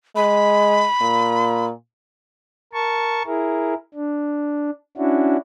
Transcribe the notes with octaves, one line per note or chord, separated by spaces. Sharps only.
G#3 B5
A#2
A#4 A5 C#6
E4 G#4 A#4
D4
C#4 D4 E4 F#4